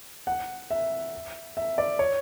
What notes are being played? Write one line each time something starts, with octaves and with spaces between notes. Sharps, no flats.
F#5
E5
E5
D5
C#5